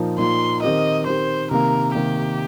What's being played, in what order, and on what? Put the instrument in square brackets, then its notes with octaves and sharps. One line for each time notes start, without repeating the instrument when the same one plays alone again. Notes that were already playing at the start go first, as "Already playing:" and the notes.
Already playing: [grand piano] A#2 F3 D#4 A#4
[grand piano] A#2 F3 D#4 A#4 [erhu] C6
[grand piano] D#3 C4 G4 A#4 [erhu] D#5
[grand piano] D#3 C4 G4 A#4 [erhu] C5
[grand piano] C3 D#3 A#3 [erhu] A#4
[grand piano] C3 D#3 A#3 [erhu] G4